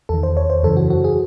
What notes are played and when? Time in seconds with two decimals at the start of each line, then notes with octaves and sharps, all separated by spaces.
0.09 E2 D#3 A4
0.23 C5
0.37 C#5
0.50 C5
0.63 F#2 C#3 E3 A4
0.77 F#4
0.90 F#4
1.04 G#4